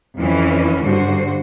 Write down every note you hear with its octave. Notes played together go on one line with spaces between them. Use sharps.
F2 E3 C#4
G2 D3 F#4 C5